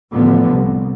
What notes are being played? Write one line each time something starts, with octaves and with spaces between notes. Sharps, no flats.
A1 D3 F3 B3
C2